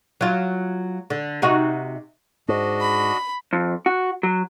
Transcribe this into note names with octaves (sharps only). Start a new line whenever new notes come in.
F#3 F4
D3
C3 D#4 F#4
G#2 D4 F#4 D#5
B5
F2
F#4
F#3